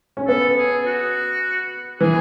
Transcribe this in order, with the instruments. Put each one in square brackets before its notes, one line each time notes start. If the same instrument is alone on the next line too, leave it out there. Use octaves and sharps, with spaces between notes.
[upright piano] C#4
[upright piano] B3 [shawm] A4
[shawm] G#4
F#4
[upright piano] E3 [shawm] G#4